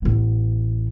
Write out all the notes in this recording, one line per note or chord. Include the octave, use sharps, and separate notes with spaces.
A1 B3